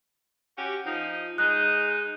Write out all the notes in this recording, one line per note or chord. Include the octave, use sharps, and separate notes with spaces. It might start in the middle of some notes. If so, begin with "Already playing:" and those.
C#4 F#4 G4
F3 D#4
G#3 D#4 F#6